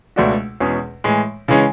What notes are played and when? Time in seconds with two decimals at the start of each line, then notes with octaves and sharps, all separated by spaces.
0.16 C#2 B2 A3 D4 F#4
0.60 E2 B2 G#3 C#4 G#4
1.04 A2 E3 G#3
1.48 C#3 E3 G#3 C#4